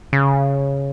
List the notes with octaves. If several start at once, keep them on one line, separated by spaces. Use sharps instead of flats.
C#3